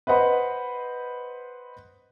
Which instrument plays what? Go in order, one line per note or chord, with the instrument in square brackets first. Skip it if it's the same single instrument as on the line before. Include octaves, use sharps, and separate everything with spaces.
[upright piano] B4 C5 D#5 F#5 B5